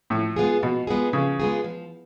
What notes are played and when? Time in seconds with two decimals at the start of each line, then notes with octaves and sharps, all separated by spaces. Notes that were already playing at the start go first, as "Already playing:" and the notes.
0.10 A2 F3
0.36 G#3 B3 F4 G#4
0.63 B2 F3
0.87 G#3 B3 F4 G#4
1.13 C#3 F3
1.40 G#3 B3 F4 G#4
1.64 F3